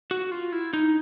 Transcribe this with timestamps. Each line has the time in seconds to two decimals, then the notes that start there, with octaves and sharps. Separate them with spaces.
0.11 F#4
0.32 F4
0.52 E4
0.73 D#4